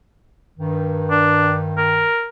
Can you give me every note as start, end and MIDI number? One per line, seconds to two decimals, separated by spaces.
0.58 2.07 43
0.58 2.07 51
1.10 1.55 62
1.77 2.28 70